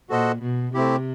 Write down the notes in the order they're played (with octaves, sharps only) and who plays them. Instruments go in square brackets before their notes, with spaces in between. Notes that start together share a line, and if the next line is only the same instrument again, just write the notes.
[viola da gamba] A#2 [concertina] F#4 A4 C5 D#5 F#5
[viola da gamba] B2
[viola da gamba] C3 [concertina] A3 C4 E4 G4